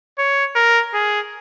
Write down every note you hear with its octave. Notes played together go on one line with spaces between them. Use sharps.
C#5
A#4
G#4